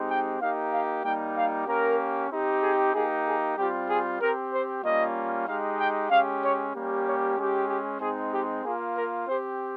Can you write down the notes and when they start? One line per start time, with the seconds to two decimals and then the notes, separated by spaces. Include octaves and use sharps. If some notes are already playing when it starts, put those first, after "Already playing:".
Already playing: G#3 C4 D#4 G4
0.09 G5
0.40 A#3 D#4 G4 F5
0.72 F5
1.04 G3 A#3 D#4 G4 G5
1.36 F5
1.67 A#3 C#4 G4 A#4
2.30 C4 D#4 G4
2.62 G#4
2.94 A#3 D#4 G4 G#4
3.25 G#4
3.57 G3 C4 F4 G4
3.89 G#4
4.20 C4 G4 A#4
4.52 C5
4.84 G3 A#3 C#4 F4 D#5
5.47 G#3 D#4 G4 F5
5.79 G5
6.10 G#3 C#4 G4 F5
6.42 C#5
6.74 G3 A#3 C#4 G4
7.05 C#5
7.37 G#3 C#4 G4
7.69 G4
8.00 G#3 C4 D#4 G#4
8.32 G4
8.64 A#3 F4 G#4
8.96 A#4
9.27 C4 G4 C5